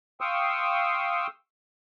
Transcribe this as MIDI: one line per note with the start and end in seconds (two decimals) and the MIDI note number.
0.21 1.27 77
0.21 1.27 79
0.21 1.27 84
0.21 1.27 85
0.21 1.27 87
0.21 1.27 88